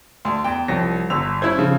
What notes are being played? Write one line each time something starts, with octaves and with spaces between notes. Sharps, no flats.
D2 C6
E2 G5
C2 F3 C#5 A#6
G1 E6 F7
C#4 E4 C5 G#6
C#3 F3